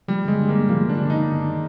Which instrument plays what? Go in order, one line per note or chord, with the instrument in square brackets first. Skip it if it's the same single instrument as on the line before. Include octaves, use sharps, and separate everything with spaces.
[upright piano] F3 [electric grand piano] G3
[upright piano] G1 [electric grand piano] G#3
[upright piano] G2
[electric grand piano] A#3
[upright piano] G1
[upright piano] F3 [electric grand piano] A#3
[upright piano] G1 [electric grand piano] D4
[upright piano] G2
[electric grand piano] D#4
[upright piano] G1
D#3